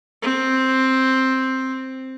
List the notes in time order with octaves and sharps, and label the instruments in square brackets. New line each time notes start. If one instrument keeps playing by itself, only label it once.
[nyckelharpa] C4